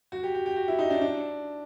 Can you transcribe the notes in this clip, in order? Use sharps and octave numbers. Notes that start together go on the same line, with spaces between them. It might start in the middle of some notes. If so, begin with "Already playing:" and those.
F#4
G4
G4
G4
F#4
E4
D#4
D4
D4